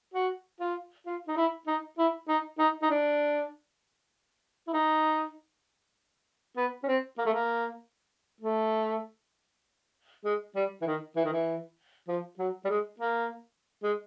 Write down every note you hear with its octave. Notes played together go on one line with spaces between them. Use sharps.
F#4
F4
F4
D#4
E4
D#4
E4
D#4
D#4
D#4
D4
E4
D#4
B3
C#4
C4
A#3
A3
A#3
A3
G#3
G3
E3
D#3
E3
D#3
E3
F3
F#3
G3
G#3
A#3
G#3